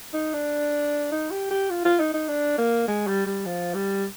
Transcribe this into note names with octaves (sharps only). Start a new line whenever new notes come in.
D#4
D4
D#4
G4
G4
F4
F4
D#4
D#4
D4
A#3
G#3
G3
G3
F3
G3